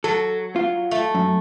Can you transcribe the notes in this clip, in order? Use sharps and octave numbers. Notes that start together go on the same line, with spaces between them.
F#3 A4
F4
A3
F#2